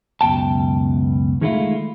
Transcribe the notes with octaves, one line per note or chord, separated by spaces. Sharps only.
C#2 F#2 B2 G5 A5
D#3 G#3 A3 B3 E4 F4